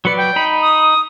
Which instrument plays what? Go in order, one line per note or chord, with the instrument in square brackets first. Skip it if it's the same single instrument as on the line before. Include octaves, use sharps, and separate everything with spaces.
[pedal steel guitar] F#3 B4 D5 [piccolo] C#7
[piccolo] G5
[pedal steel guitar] D#4 B5
[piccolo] D#6